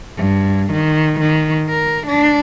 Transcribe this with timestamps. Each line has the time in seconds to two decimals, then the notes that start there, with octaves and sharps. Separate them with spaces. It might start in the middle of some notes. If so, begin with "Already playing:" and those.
0.17 G2
0.72 D#3
1.20 D#3
1.69 A#4
2.07 D4